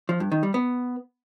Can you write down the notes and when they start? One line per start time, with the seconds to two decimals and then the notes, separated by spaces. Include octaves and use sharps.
0.09 F3
0.20 G2
0.32 D#3
0.43 G3
0.54 B3